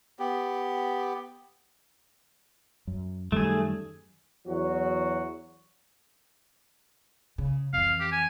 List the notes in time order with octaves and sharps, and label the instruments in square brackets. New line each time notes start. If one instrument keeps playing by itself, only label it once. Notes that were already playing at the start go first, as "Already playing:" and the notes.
[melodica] B3 G4
[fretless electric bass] F#2
[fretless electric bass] F#2 D#3 G3 [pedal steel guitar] A3 G#4
[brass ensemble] E2 F#3 F#4
[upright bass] C#3
[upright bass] F2 E3 [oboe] F5
[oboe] G4
G#5